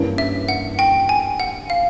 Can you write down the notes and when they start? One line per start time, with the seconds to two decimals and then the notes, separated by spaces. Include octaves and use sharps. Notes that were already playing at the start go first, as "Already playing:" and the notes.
Already playing: G2 E3 G3 A#3 C#4
0.18 E5
0.49 F#5
0.79 G5
1.09 G#5
1.40 F#5
1.70 F5